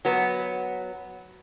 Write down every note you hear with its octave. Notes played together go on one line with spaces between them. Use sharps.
F#3 B3